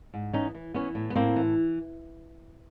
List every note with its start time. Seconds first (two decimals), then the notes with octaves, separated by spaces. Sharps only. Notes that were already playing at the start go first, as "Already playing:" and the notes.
0.14 G#2
0.33 E3 C#4 D#4
0.54 E3
0.74 E3 B3 C#4
0.95 A2
1.10 B3
1.15 A2 A#3 C4
1.36 E3